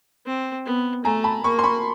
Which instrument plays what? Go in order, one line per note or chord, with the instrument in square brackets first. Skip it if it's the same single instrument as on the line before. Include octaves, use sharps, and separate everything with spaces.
[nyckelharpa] C4
B3
[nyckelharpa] A3 [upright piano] G#5 A#5
[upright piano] A5 B5
[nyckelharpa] A#3 [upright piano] B5 C#6
[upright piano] C6
B5 C#6